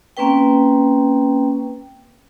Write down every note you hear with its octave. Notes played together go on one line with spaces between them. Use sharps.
A#3 C4 C#4 B4 G5